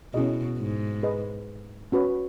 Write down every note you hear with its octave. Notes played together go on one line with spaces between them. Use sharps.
B2 C#4 E4 G#4 D#5
G#2
G#4 B4 D#5
C#4 F#4 B4